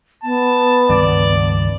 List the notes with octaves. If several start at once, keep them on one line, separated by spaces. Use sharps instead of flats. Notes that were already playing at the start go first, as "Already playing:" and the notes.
B3 A5
C#2 G2 D#3 D5